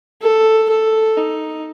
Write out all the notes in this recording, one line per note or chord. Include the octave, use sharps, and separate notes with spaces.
A4
A4
D#4